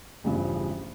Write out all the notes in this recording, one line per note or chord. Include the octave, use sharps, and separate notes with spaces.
A1 E2 G2 C#3 F3